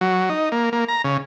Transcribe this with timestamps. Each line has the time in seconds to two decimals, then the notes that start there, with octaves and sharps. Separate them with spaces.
0.01 F#3
0.30 D#4
0.52 A#3
0.73 A#3
0.88 A#5
1.04 C#3